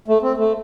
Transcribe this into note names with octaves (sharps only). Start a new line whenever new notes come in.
A3
C4
A3